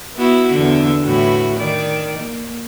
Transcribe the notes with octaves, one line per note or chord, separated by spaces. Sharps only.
B3 E4 F#4
E2 D3
A2 E3 F#4
D#3 D5
A#3